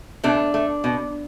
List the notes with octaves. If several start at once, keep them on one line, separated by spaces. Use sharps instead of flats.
B2 A3 D4
A3
B2